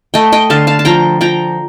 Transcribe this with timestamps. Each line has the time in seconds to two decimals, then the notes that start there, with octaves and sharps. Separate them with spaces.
0.14 A3 D#5 G5
0.32 D#5 G5
0.50 D3 F5 A5
0.67 F5 A5
0.79 A5
0.85 F3 G5 A#5
1.21 F3 G5 A#5